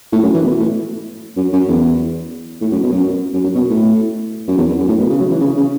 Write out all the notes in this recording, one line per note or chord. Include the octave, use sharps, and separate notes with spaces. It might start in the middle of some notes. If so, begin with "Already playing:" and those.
A2
F#2
E3
B2
A2
F#2
F#2
E2
A2
F#2
B2
F#2
F#2
F#2
B2
A2
F#2
E2
E2
F#2
A2
B2
C#3
F#3
E3
C#3
C#3